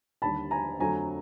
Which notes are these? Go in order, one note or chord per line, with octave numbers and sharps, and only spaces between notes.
D#2 D3 G3 A5 B5
G#5 A#5
F2 D3 F#3 A3 G#5 A#5